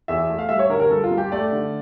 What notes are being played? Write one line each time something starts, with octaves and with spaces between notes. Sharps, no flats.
E2 E5
A3
F5
G3 E5
C#5
D3 A#4
A#4
G2 A4
F4
G2
G4
A3 D5
D3